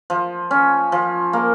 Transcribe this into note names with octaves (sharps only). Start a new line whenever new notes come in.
F3
C#4
F3
A#3